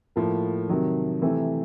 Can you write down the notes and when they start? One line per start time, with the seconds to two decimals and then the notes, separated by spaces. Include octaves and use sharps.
0.16 A2 F3 A#3
0.69 C3 D#3 F#3
1.22 C3 E3 A3 C4